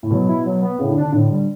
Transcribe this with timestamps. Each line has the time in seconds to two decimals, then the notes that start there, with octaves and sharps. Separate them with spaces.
0.03 A2
0.11 B2 F#3
0.28 E4
0.45 F#3
0.62 B3
0.79 A2 C#3
0.90 D3
0.96 D4
1.02 D3
1.12 A2 D3
1.30 G3